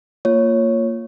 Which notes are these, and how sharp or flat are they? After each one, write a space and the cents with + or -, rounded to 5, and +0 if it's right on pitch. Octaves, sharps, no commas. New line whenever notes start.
A#3 -15 F4 +0 C#5 +0